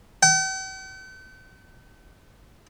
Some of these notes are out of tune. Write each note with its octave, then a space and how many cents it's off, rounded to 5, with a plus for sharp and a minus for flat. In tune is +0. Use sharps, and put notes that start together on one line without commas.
G5 -45